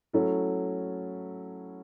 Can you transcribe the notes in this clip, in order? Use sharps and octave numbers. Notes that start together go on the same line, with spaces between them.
F#3 A3 C#4 E4 A4